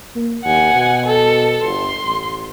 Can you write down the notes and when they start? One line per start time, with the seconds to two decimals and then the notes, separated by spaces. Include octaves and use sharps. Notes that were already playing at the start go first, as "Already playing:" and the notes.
0.16 A#3
0.45 D#2 F#5 G#5
0.74 B2
1.06 A4
1.63 G1 C6
2.05 A1